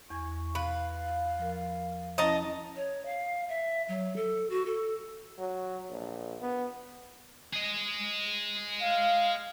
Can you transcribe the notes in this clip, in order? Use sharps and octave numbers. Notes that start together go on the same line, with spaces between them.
E2 G#5 C#6 G#6
B4 F5
F3 A#4
F3 C#4 E4 D#5 A5 A#5
C#5
F5
E5
F#3
A4
F#4
A4
F#3
A#1
B3
G#4 D#5
F5